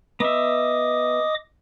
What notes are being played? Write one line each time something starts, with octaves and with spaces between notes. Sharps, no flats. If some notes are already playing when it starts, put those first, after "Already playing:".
B3 D#5 E5 D6 D#6